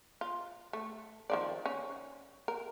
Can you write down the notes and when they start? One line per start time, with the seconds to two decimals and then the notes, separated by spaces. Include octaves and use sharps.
0.21 F4
0.73 A3
1.30 D#3 F3 D5
1.66 C#4
2.48 A#4